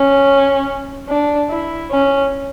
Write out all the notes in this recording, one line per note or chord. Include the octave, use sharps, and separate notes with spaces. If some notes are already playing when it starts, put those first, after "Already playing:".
Already playing: C#4
D4
E4
C#4